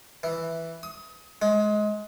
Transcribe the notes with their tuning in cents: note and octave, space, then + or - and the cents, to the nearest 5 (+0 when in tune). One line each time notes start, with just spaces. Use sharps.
E3 +0
D#6 +30
G#3 +20